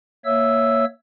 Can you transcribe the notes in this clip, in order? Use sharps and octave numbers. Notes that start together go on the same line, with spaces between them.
A#3 C#5 E5 E6